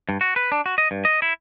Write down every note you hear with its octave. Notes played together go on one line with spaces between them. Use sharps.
G2
F#4
B4
D4
F#4
D#5
G2
D#5
E4